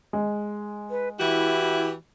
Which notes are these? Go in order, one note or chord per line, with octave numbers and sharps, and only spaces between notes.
G#3
B4
E3 E4 F#4 G4